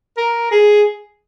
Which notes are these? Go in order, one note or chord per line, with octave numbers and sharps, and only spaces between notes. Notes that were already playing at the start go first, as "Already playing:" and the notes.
A#4
G#4